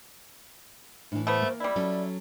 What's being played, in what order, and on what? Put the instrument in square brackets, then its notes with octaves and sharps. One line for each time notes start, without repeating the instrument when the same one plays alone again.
[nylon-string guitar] A2 E3 [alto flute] D4
[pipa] A3 B3 [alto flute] C5
[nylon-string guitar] A#3
[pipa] G3 E4 [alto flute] D5
[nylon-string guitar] F#3 C#4 A4